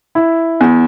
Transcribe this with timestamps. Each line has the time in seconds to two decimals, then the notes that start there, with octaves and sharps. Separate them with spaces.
0.15 E4
0.61 E2